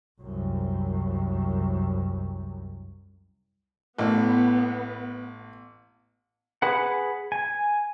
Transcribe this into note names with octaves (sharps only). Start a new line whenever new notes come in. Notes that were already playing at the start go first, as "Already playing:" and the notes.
C2 F#2
A1 B3
G#4 B4 F#5
G#5